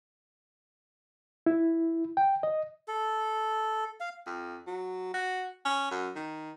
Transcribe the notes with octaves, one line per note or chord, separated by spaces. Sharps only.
E4
G5
D#5
A4
F5
F2
F#3
F#4
C#4
F#2
D#3